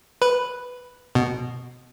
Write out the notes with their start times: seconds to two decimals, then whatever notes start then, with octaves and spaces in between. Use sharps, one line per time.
0.22 B4
1.15 B2